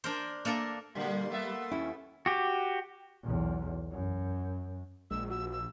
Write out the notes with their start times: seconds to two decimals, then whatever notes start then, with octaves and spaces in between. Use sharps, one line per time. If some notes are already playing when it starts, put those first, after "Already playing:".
0.04 D4 A#4 C5
0.45 A#3 D4 A4 A#4
0.95 A#2 D3 G3 A#3 C6
1.30 A3 B3 E5
1.71 D#2 C#4 E4
2.26 F#4 G4
3.24 B1 E2
3.92 F#2
5.11 A#1 G#3 E6
5.30 F#4 E6
5.52 E6